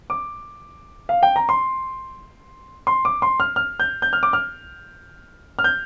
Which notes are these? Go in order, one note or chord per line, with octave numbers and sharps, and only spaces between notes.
D6
F5
G5
A#5
C6
C6
D6
C6
F6
F6
G6
G6
F6
D6
F6
F6
G6